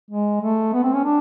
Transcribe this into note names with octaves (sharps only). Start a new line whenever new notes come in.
G#3
A3
B3
C4
C#4
D4